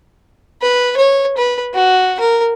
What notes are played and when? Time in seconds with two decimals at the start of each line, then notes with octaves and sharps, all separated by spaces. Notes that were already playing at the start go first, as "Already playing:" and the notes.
0.62 B4
0.97 C#5
1.37 B4
1.74 F#4
2.20 A#4